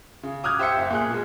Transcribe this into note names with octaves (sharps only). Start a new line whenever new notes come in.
C#3
D6 D#6 F6 F#6 G#6
G4 C5 E5 E6 C#7
F#1 E5
A#2 G#4 F#6
B2 G#3